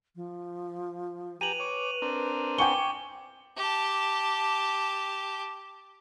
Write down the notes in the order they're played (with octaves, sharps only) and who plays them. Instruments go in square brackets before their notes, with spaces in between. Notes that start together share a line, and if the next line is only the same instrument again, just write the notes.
[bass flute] F3
[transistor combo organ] G4 G#5 A#5 [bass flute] B4 [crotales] D#7 F7 F#7
[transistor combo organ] C#5 D6
C4 D4 A#4
[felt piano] G5 G#5 C#6 [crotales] D6 G7
[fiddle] G4 A5